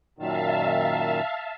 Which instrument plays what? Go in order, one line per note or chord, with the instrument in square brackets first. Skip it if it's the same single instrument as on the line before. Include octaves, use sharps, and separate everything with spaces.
[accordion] F#2 A#2 D#3 [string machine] E5 F5 A5